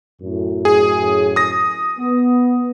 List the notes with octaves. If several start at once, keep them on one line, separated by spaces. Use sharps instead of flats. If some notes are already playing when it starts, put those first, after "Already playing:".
F#2 A2
G#4
D#6 A#6
B3